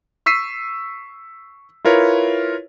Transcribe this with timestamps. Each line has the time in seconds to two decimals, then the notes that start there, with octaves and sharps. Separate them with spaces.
0.26 C#6 E6 B6 C7 D#7
1.85 E4 F4 A#4 B4 C#5